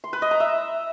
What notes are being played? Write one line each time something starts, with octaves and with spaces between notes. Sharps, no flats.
C6
B4
D#5
A#5
E5